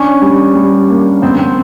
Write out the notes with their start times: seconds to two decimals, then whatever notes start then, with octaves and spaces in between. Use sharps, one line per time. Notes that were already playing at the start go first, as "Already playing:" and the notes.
Already playing: C#4 D4
0.22 G3
0.55 G3
0.89 A#3
1.22 B3 C4
1.38 C4